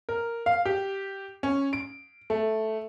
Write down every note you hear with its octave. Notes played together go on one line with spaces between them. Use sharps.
A#4
F5
G4
C#4
D7
A3